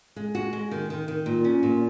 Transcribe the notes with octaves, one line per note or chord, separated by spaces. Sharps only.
G#3
F#4
G#3
D#3
D#3
D#3
A#2
C#4
A#2